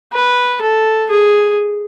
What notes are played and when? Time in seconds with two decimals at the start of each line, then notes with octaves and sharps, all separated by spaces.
0.13 B4
0.62 A4
1.10 G#4